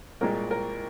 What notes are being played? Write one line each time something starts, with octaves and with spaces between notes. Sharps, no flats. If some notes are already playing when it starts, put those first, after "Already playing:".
C2 A#2 G#3 A#4
A#4